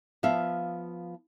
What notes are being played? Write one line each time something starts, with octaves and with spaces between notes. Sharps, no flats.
F3 B3 E5 F5